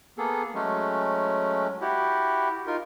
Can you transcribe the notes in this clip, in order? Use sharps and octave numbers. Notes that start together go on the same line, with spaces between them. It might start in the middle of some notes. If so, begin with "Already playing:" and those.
A#3 B3 G#4 A4
F#3 G#3 A3 C#4
E4 F#4 G4
D#4 F4 A#4